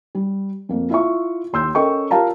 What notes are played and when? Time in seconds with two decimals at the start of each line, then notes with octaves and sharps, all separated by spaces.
0.15 G3
0.69 F2 A#3
0.90 E4 F4 E5 C#6
1.53 D#2 C6 E6 G6
1.75 C#4 A4 A#4 D#5 G5 C#6
2.11 F4 G4 A#4 F5 A5 A#5